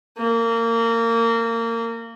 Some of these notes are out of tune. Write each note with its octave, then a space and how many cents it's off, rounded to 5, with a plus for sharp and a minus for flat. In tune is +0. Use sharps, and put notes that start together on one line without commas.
A#3 -25